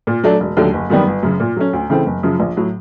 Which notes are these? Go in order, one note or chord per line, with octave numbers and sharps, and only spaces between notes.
A#2
F#3 A3 D4
E1
D#2 D3 F#3 A3
F#1
F#2 D#3 G3 B3
G1
F#2 C#3
A#2
F#3 A3 C#4
D2
C#3 E3 A3 C4
F#1
F#2 C#3 F3
A#1
A2 F#3